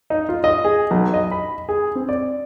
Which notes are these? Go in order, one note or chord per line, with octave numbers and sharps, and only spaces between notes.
D#4
F4
D#5
G#4
B1
D#5
B5
G#4
C4
D5